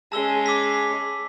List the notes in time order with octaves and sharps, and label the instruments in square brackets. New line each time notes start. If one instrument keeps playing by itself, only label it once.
[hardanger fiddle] G#3 C#4 [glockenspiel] A5 E6 G7
[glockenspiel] D6 E6 B6